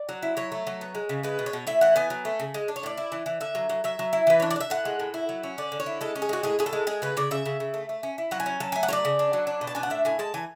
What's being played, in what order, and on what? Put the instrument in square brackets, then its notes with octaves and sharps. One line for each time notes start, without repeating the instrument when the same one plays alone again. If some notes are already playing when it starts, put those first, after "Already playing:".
Already playing: [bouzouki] D5
F#3
E4
F#3 C#5
A3
F#3
B3
G#3
C#3
G#3 B4
B2
C#5
B2
A2 E5
E3 F#5
B3 G#5
F#3
A3
C#3
G#3
D4
C#5
A2 D5
E4
E3
E3
D3 E5
F#3
F#3
F#3 E5
F#3
E4
E3 B4
D4 C#5
D5
D4
E5
A2 F#5
G#3
A2
E4
F#3
C#4
D3 D5
D3
C#5
E4
G#3 A4
C#4
G#4
G#3 F#4
A2 G#4
A2 G#4
A4
G#3
G#3 G#4
C#3 B4
C#3 D5
C#3 E5
C#3
C#3
A3
A3
C#4
E4
F#3 F#5
G#5
C#4
F#3 A5
A3 G#5
F#5
F#3 C#5 D5
C#3
D4
F#3
D4
B2
A5
D4 G#5
F#5
A2 E5
A2 G#5
G#3 A5
E3 G#5